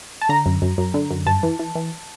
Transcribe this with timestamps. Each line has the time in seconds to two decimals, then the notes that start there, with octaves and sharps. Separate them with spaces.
0.21 A5
0.29 D3 A#5
0.46 F#2
0.62 F#2
0.78 F#2
0.94 D3
1.11 F#2
1.26 G2 A5
1.43 E3
1.59 E3
1.75 E3